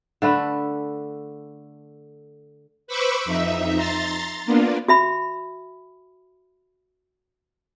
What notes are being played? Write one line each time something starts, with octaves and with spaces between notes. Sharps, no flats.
D3 A3 B4
B4 C5 B5 C#6 D6 E6
F2 D#4 E5
A#5 C6 A6
A#3 B3 D4 F4
F#4 E5 B5